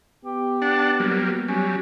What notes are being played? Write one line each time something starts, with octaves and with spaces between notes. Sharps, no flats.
B3 G4
D4 F#5 A5
F#3 G3 A#3
F#3 G3 C#4